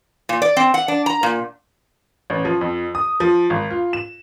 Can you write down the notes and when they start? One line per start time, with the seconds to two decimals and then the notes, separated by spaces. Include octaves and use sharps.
0.29 A#2
0.42 D5
0.57 C4
0.74 F#5
0.88 D4
1.06 A#5
1.23 A#2
2.30 A1
2.45 F3
2.61 F2
2.95 D#6
3.20 F3
3.50 G#1
3.71 F4
3.93 E7